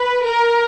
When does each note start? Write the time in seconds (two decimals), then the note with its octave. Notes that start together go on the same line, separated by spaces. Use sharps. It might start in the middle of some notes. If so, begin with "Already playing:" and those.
Already playing: B4
0.25 A#4